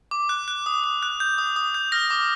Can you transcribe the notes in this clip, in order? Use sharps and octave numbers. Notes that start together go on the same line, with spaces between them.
D6
F#6
F#6
D#6
D#6
F#6
G6
D#6
D#6
G6
F6 A#6
D6